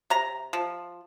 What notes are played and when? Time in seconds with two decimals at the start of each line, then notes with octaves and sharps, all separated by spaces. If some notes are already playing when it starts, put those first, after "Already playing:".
0.10 C3 A#5
0.53 F3